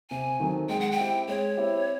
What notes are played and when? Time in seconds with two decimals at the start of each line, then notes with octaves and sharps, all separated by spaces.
0.10 C3 G#5
0.40 D#3 F#3 A3 C4
0.69 G#3 G5
0.80 F#5
0.91 G5
0.99 C4 E4 G4
1.28 G#3 C#5
1.57 C4 E4 G4